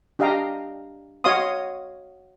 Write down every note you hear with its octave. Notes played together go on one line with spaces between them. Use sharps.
D4 G4 D#5 F5 G5 A#5
F#4 C#5 D#5 F5 C6 D#6